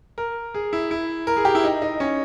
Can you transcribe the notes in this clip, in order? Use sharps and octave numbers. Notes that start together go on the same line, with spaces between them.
A#4
G#4
E4
E4
A#4
G#4
G4
E4
D#4
D#4
C#4